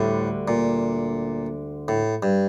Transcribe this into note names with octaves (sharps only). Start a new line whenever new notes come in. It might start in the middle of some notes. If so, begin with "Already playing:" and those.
Already playing: D2 A2 D3 G3
A#2
A2
G2